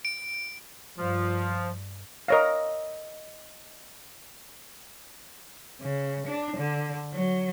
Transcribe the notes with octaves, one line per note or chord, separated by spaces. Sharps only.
D7
G2 F3
A#4 C#5 D#5 F5 E6 A#6
C#3
D4
D3
F#3